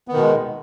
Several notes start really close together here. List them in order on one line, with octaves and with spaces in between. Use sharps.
B3 D#3 B2 G#3